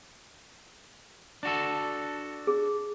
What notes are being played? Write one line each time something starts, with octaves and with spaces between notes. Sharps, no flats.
D4 F#4 A4
G#4